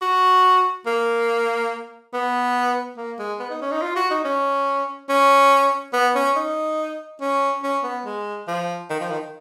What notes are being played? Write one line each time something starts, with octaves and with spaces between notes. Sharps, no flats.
F#4
A#3
B3
A#3
G#3
B3
D#4
C#4
D#4
F4
F#4
D#4
C#4
C#4
B3
C#4
D#4
C#4
C#4
B3
G#3
F3
D#3
F3
D#3